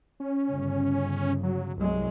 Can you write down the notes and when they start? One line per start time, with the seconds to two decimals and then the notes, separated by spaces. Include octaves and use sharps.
0.20 C#4
0.50 G1 C#3
1.43 F#3
1.77 C2 F#3 G#3